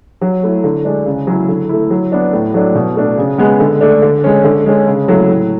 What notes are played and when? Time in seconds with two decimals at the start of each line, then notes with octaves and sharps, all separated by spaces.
0.21 F#3
0.43 A3 E4
0.64 D3
0.85 G#3 D4
1.06 C#3
1.27 F#3 C#4 E4
1.49 D3
1.69 A3 E4
1.90 F#3
2.12 B3 D4
2.33 A2
2.54 F#3 A3 D4
2.75 B2
2.96 A3 D4
3.17 C#3
3.38 G#3 B3
3.60 D3
3.81 A3 D4
4.02 D3
4.24 G#3 C#4
4.44 D3
4.66 G#3 C#4
4.87 C#3
5.08 F#3 A3 E4
5.29 A2